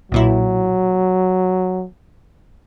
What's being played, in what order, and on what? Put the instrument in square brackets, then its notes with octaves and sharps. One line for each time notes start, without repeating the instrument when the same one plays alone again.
[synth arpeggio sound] B1 A#2 E4 [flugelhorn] F#3